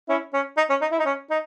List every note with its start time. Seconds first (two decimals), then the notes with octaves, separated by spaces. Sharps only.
0.09 C#4 E4
0.33 C#4
0.57 D#4
0.70 C#4
0.81 D#4
0.92 E4
0.99 D#4
1.05 C#4
1.30 D#4